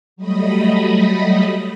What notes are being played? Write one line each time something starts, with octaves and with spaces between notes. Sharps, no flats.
F#3 G3 A3 D#5 B5 D#6